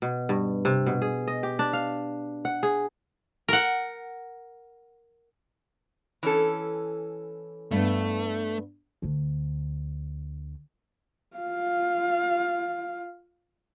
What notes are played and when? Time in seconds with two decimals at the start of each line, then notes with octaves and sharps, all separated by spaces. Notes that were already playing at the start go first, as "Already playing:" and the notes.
0.02 B2
0.29 G2
0.65 C3
0.86 B2
1.02 G#4
1.28 D#5
1.43 G4
1.59 D4
1.73 F5
2.45 F#5
2.63 G#4
3.48 A#4 F#5
6.23 E3 C#4 A4
7.71 G2 A3 B3
9.02 D2 D3
11.37 F4 F5